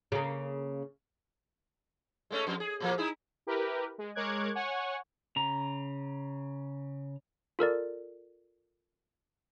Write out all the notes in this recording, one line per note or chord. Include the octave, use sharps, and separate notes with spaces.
C#3 A#3
G#3 A3 C#4
F2
G#4
A#2 F3 A#3
D#4 E4 G#4
E4 G4 A#4 B4
G#3
G#3 A#4 C#5 D6 F#6 G#6
C#5 F#5 G#5 C#6
C#3 A#5
F4 A4 A#4 D5